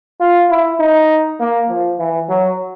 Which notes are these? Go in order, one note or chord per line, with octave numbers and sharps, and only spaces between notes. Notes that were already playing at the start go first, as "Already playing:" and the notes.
F4
E4
D#4
A#3
F3
E3
F#3